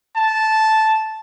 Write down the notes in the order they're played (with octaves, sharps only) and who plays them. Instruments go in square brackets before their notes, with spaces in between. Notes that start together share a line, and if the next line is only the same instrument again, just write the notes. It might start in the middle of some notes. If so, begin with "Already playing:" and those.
[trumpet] A5